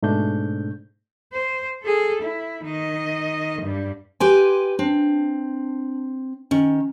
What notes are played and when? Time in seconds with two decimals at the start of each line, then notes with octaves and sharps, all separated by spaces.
0.03 G#2 B2 A3 D4 G6
1.32 C5
1.82 G#4 A4
2.22 E4
2.64 D#3 D#5
3.62 G2 G3
4.20 G4 B4 G#5 C6
4.79 C4 D4
6.51 D#3 C#4